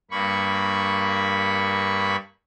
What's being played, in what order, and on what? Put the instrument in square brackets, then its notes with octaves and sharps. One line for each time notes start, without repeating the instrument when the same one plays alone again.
[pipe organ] G2 A#3 B5 C#6